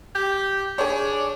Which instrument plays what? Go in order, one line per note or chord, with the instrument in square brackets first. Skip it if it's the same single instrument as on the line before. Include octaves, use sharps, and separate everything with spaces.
[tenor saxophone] G4
[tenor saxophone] D4 [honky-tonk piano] G#4 C#5